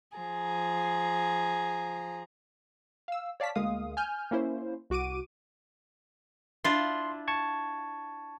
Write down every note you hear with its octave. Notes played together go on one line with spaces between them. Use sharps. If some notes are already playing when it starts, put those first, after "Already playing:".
F3 G#4 A#5
F5 E6
C#5 D5 F5 A5 B6
D2 G#3 A#3 F5 D#6
G#5 F6 G6
A#3 C#4 E4 C5
C2 F#4 D6 D7 D#7
D4 E4 F4 C6
A5 C#6 G#6